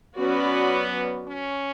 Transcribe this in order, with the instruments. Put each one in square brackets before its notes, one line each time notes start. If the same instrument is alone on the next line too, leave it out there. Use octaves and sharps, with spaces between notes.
[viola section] F#3 C#4 F#4 B4 D5 [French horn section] B3
[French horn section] C#4